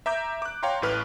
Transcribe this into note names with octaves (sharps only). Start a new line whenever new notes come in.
E5 A#5 D6 G6
D6 F#6
C#5 F5 G5 A#5 C6
A1 A2 B4 F6